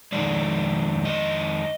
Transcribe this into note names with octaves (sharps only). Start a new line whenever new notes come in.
F2 D#3 G#3 D#4 D5
D#5